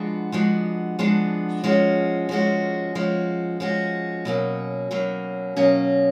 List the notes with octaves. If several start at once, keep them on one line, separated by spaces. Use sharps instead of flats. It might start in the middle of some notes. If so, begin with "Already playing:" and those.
Already playing: F3 G#3 B3 D4 F#4
F3 G#3 B3 D4 F#4
F3 G#3 B3 D4 F#4
F3 G#3 C#4 F#4
F3 G#3 C#4 F#4
F3 G#3 C#4 F#4
F3 G#3 C#4 F#4
B2 F#3 A#3 C#4
B2 F#3 A#3 C#4
B2 F#3 A#3 C#4